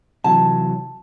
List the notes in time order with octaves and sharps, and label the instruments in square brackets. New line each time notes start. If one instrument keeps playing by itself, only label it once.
[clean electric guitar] C3 E3 F#3 [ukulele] A5